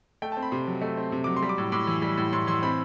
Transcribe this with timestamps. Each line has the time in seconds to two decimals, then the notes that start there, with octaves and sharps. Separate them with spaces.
0.22 A3 G5
0.32 A5
0.37 C4
0.42 B5
0.51 C3 C6
0.67 F#3
0.82 A3
0.97 C4
1.12 C3
1.24 F#3 D6
1.37 C6
1.42 G3
1.49 D6
1.58 A2
1.72 A2 D6
1.87 E3
2.02 G3
2.17 A2
2.33 A2 C6
2.47 E3 C6
2.63 C4 B5